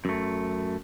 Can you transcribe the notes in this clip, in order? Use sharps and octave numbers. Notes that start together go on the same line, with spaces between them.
F#2 A3